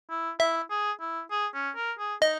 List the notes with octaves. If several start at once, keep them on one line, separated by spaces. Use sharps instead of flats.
E4
E4 E5
G#4
E4
G#4
C#4
A#4
G#4
D#4 D#5